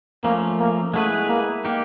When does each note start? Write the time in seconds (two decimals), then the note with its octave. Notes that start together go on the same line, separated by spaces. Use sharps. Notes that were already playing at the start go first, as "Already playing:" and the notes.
0.24 F3 A3 A#3 C#4
0.60 A#3
0.94 G#3 A3 B3 E4 G#4 B4
1.29 A#3
1.65 A#3 D#4 G4